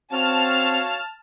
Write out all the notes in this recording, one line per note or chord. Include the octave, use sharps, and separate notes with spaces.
C4 F#4 C#5 F5 A5 F6